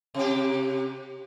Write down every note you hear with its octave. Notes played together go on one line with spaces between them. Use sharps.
C3 G4